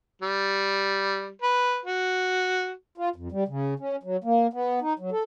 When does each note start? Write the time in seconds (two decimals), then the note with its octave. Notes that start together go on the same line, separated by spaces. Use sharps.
0.22 G3
1.42 B4
1.85 F#4
2.98 F4
3.16 F2
3.32 G3
3.48 C#3
3.79 C#4
4.03 F#3
4.24 A#3
4.53 B3
4.82 D#4
4.99 F#3
5.12 A4